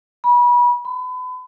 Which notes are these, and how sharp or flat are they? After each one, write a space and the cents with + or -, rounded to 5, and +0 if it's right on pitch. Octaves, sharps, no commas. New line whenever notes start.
B5 -30
B5 +35